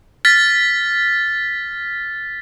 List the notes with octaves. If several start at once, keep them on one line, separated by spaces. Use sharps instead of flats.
F6 A6 B6